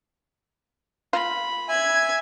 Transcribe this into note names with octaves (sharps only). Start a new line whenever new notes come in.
F4 B5
E5 G#5 G#6